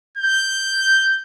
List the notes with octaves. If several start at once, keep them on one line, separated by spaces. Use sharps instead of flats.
G6